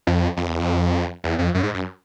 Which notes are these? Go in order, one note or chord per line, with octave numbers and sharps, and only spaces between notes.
F2
F2
E2
F2
E2
F2
F#2
G#2
F#2